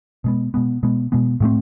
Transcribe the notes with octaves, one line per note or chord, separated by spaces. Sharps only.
B2 G#3 B3
B2 G#3 B3
B2 G#3 B3
B2 G#3 B3
A2 F#3 A3 C4